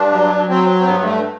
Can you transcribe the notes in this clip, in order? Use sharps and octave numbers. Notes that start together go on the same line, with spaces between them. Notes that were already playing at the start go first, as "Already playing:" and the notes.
Already playing: G2 D4
F#3
F#3 C4
C4
G2 B3
A3